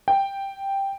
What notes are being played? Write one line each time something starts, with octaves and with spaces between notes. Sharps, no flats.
G5